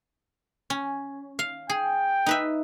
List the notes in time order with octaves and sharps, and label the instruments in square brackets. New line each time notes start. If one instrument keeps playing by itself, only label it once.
[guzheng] C#4
F5
[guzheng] G#4 [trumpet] G5
[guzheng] D#4 B4 E5